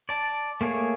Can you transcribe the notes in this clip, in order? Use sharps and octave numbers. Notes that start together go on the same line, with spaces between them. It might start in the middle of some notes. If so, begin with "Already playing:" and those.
D5 A5
A3 A#3 G#4 C#5